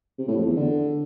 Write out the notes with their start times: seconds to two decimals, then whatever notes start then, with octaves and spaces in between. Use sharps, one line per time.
0.19 C3
0.28 A2
0.37 F2
0.47 E2
0.56 D3